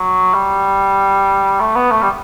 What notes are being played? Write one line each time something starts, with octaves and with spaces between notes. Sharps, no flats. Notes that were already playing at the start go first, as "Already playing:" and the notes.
Already playing: F#3
G3
A3
B3
A3
G3